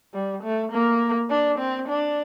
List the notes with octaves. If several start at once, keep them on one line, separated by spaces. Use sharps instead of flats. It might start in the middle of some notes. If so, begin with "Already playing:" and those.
G3
A3
A#3
D4
C4
D4